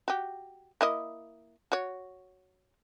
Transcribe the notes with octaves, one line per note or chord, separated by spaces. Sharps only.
F#4 G4
A#3 E4 D#5
F#4 C#5